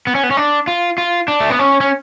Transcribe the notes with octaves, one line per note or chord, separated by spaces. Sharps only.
B3
C#4
B3
C#4
D4
F4
F4
D4
A3
B3
C#4
C#4